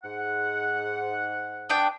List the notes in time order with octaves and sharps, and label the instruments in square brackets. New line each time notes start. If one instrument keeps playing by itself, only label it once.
[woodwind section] G#2 F#5
[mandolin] B3 D4 G5